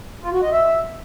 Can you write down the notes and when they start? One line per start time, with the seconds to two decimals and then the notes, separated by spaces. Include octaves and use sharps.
0.23 F4
0.33 F#4
0.42 D#5
0.52 E5